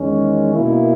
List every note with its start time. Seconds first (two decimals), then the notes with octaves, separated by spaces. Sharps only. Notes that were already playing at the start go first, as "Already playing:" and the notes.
Already playing: E2 D#3 G#3 C#4
0.54 B2 A#3 E4